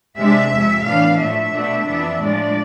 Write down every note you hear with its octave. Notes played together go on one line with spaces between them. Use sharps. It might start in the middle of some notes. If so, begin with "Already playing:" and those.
C3 G#3 D4 E5
F2 C3 G#3
A2 E3 B3 D4 F5
A2 F3 A3 E5
B2 A3 D4
F2 E3 B3 D4
A2 F3 G#3 D4 D5